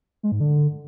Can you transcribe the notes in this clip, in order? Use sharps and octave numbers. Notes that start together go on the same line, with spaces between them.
G#3
G#2
D3